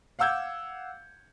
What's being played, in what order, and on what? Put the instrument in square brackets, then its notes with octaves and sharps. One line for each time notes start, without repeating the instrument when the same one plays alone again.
[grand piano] F5 F#5 D6 E6 G6 G#6